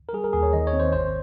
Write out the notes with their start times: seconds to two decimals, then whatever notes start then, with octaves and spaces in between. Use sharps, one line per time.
0.09 A#4
0.13 G3 G#4
0.24 A#4
0.33 D#2 G#4
0.43 C#5
0.53 D#3 D#5
0.67 C#5
0.73 C4
0.80 C5
0.92 G#1 C5